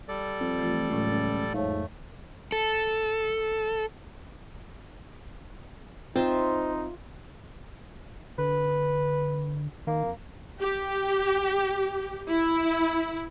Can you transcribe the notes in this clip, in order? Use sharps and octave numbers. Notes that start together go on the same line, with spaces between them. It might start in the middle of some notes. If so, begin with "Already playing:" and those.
G3 A4 D5
F2
E3 A3 F4
C#2 A2 F#3 A3
C#2
F2 G#2 A3 C#5 F5
A4
C4 D#4 F4 C5 E5
D3 B4
D#3 A#3
F2
G4
E4